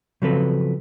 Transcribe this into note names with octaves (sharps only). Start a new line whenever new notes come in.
C#3 F3 F#3 C4 A4 B4